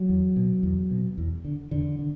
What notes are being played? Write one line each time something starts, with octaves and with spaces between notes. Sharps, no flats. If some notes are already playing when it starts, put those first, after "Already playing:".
Already playing: F#3
E2
B2
E2
B2
E2
D3
E2 D3
D3